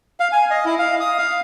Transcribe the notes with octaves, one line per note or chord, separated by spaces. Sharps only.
F5
G#5
D#5
E4
F5
D#6
F5